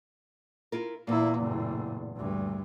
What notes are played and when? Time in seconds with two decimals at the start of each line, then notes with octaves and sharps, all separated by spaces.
0.72 E4 F4 A#4
1.07 E2 A#2 A#3 E4
1.39 F#1 A2
2.16 D2 G2